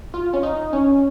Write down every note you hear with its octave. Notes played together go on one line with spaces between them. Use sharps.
F4
C#4
D#4
C#4